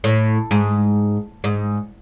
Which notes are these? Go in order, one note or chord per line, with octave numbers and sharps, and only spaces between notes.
A2
G#2
G#2